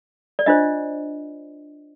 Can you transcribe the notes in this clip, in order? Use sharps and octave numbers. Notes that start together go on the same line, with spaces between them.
D5
D4 F4 C5 D#5